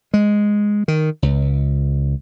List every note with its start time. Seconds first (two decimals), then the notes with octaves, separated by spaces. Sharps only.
0.14 G#3
0.88 D#3
1.22 C#2